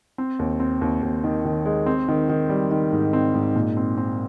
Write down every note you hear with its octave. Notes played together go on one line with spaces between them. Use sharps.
C4
D#2
C4
D#2
D#2
D#3
D#3
G#3
C4
D#3
D#3
G3
D#3
G#2
C4
G#2
A#2
C4
C4